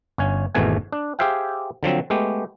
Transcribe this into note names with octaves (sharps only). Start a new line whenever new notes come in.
G1 C#4 G#5
G#1 E2 G#2 B2 A3 G#5
D4
G4 G#4 C5 E5 F5 G5
D3 F3 F#3 C4
G#3 A3 B3 G4